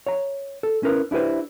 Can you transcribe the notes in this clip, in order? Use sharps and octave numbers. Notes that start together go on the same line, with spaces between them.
C#5 A#5
A4
C#4 E4 A#4 B4
D4 E4 G4 B4 C5